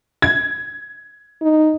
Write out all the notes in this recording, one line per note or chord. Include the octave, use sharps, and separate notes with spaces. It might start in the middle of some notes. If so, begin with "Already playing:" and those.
G#6
D#4